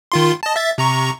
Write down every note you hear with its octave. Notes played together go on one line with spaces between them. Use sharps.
D#3 F4 C6
D#5 A5
E5 A6
C3 A#5 C#6